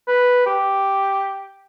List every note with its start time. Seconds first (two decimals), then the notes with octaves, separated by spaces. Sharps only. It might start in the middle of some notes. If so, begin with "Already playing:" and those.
0.08 B4
0.46 G4